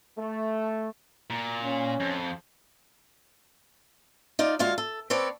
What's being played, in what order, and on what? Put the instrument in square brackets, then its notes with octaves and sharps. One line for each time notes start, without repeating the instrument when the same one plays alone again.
[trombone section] A3
[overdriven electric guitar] A#2
[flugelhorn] C#4
[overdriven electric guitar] F2
[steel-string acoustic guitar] D#4 F4 D5
D2 G#3 F4 F#4 F5
A4
C4 A4 B4 C#5 D5